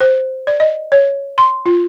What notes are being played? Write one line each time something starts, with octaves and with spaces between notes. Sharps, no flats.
C5
D5
D#5
C#5
C6
F4